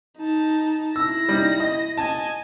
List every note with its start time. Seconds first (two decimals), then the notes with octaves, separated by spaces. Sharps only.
0.18 D#4 A5
0.96 E4 E6 A#6
1.29 G3 D#4
1.60 D#5
1.97 D#5 G#5 A5